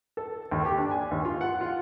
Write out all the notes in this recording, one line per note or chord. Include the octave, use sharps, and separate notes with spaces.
A4
D#2
G4
D4
G#5
D#2
F4
F#5
F4